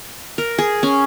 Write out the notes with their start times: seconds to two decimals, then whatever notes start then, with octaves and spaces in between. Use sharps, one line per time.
0.38 A#4
0.58 G#4
0.83 C#4